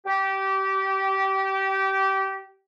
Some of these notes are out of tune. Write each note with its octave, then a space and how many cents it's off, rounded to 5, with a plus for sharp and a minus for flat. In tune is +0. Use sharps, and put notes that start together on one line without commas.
G4 -25